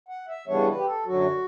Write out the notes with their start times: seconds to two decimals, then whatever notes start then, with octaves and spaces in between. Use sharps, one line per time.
0.09 F#5
0.28 E5
0.47 C#3 E3 G3 B3 D4 C#5
0.67 B4
0.77 G4
0.87 A4
1.05 F#2 D3 F#3 F#4